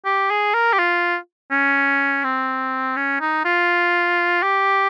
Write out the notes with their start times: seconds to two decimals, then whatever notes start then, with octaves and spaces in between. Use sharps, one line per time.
0.06 G4
0.30 G#4
0.54 A#4
0.73 G4
0.79 F4
1.51 C#4
2.24 C4
2.97 C#4
3.21 D#4
3.45 F4
4.43 G4